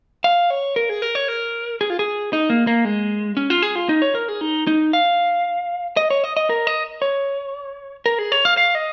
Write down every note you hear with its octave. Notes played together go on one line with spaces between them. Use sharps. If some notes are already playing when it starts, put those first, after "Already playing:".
F5
C#5
A#4
G#4
A#4
C#5
A#4
G#4
F4
G#4
D#4
A#3
A#3
G#3
C#4
F4
G#4
F4
D#4
C#5
A#4
G#4
D#4
D#4
F5
D#5
C#5
D#5
D#5
A#4
D#5
C#5
A#4
G#4
C#5
F5
F5
D#5